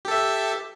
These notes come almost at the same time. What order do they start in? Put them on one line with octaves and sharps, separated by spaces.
G4 A4 E5